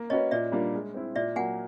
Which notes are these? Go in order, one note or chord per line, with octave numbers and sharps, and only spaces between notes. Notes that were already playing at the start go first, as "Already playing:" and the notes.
Already playing: A#3
C#4 F#4 B4 C#5 D#5
A#2 D5 E5
G3 A#3 D4 F4
G#3
C4 E4
A#2 D5 E5
F#3 A#3 F#5 G#5